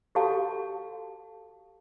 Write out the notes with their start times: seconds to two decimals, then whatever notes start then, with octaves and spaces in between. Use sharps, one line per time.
0.15 F#4 G4 A4 C#5 F5 A5